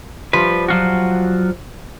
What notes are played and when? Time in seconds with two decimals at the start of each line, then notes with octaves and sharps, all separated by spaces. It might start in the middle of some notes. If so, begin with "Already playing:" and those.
0.33 F3 G3 B4
0.68 F#3 F4 F#4